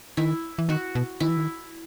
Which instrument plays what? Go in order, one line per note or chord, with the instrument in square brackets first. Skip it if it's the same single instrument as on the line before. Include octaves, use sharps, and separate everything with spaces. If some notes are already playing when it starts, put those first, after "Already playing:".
[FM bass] D#3 [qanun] E4
[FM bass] E3
[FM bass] D#3 [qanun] F#4
[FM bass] B2
[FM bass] D#3 [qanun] E4
[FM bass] E3
D#3